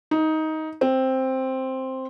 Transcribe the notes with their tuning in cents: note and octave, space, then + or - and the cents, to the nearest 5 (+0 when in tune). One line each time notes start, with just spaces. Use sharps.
D#4 +15
C4 +5